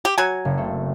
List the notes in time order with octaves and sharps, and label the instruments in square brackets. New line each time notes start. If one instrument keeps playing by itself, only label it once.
[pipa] G4
[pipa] F#3 G#5 [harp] A#5 C#7
[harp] F#1
A3 C4